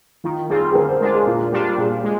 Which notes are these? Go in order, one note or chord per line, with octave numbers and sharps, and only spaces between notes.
D#3 F4
G3 C4 F4 G#4
G#4
D3 A#4
C5
G#3 D4 F4
G#4
A#2 F4
G3 D4 F4 G4
A#2 G#4
G#3